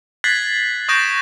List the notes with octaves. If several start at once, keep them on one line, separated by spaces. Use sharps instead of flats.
F#6 G#6 A6 B6 C7 F#7
C#6 D#6 G6 A#6 D7 E7